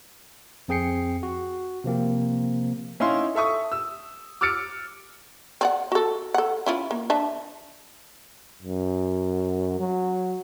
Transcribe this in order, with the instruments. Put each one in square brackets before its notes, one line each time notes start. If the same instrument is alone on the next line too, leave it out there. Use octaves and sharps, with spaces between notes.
[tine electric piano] F2 C4 G#4 G5 C7 C#7
F#4
C3 F3 A#3 C4
[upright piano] C#4 D#4 E4 F5 C6
A4 E5 C#6 D#6
E6
D6 E6 F6 A6 C#7 D7
[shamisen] C4 D5 F#5
F#4 A4
A4 F#5
C#4 E4 F4
A#3
D4 E5 A5
[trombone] F#2
F#3